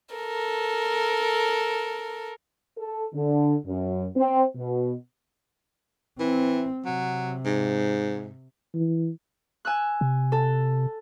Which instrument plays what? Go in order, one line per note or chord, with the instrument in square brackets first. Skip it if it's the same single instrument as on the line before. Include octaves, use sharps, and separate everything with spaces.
[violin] A4 A#4
[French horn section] A4
D3
F#2
C4
B2
[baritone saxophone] E3 [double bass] C4
[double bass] C3 [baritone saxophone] F#3
[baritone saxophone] G#2
[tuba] E3
[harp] G#5 E6 F#6
[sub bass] C3
[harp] A4